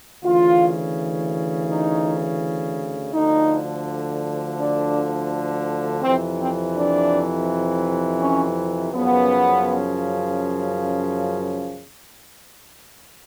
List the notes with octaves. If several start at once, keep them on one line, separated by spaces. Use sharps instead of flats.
D2 C#3 E3 F4
D#4
D2 D3 F3 D#4
D4
F2 C3 E3 C4
C4
D4
C#4
F#2 C#3 F3 B3